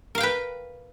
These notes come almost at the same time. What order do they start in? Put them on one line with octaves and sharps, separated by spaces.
A#4 F5 G5 B4